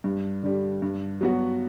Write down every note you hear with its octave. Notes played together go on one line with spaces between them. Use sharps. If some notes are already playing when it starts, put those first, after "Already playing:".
G2
D3 G3
G2
F#3 B3 F#4